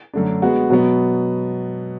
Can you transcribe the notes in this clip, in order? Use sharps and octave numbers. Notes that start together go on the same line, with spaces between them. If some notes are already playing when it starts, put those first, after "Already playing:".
F#2 D3 A3 D4
G#3 B3 F#4
B2 F#3 B3